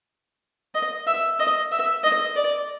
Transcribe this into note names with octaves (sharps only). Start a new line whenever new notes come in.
D#5
E5
D#5
E5
D#5
D5